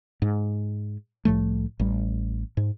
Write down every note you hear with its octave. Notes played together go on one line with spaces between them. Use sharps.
G#2
C2 A2 F3 A3
A1 G3
G#2